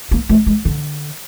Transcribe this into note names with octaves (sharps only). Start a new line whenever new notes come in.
A#3
A3
G#3
D3